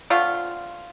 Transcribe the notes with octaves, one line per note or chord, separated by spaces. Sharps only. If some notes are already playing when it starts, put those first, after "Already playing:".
D3 A3 C4 F4